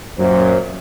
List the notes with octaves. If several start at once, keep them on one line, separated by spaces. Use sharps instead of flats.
F#2 A#2 F#3 C5